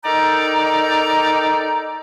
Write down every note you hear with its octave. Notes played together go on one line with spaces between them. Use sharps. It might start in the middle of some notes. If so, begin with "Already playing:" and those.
D#4 A4 A#4 D5 G5 A#5